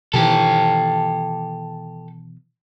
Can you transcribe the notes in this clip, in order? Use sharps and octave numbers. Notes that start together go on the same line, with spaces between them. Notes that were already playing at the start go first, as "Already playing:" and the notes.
B2 D#3 E3 G4 A4